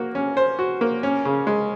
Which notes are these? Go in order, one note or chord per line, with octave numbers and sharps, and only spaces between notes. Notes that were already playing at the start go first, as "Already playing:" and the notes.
Already playing: A#3 F#4
C#4
C5
F#4
A#3
C#4
C#3
G#3